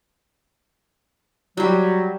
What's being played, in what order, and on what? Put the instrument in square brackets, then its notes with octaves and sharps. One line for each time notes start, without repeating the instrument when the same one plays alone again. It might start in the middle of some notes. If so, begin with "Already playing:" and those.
[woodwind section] F#3 [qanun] G3 G4